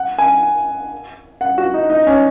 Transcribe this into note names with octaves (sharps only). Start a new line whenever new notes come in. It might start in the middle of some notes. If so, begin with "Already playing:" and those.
Already playing: F#5
G#5
F#5
F#4
D#4
D#4
C#4